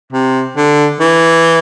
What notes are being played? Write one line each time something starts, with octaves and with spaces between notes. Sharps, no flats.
C3
D3
E3